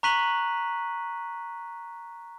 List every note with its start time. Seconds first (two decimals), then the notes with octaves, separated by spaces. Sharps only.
0.03 A#5 C#6 F#6 B6 D#7 F#7